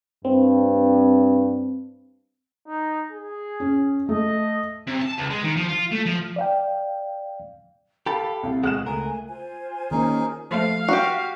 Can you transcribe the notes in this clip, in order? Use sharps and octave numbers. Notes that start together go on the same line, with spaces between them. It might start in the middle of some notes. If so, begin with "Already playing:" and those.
G2 C4
D#4
G#4
C#4
A3 D#5
C3
A5
C#2
G#3
D#3
F3
F4
A3
F3
D5 F5 G5
G4 A4 F5 B5
C2 F5
D2 B2 G#3 G#4 F#5 F#6 E7
C#2 A3 A#4 G#5
F4 C5 G#5
D#3 A#3 C#4 D#4 G#4 A#4
F3 A3 F5
F#4 G4